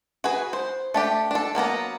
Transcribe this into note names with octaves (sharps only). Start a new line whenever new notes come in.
F#4 G#4 B4
C5
A3 D4 G4
D4 A4
F#3 A#3 B3 A#5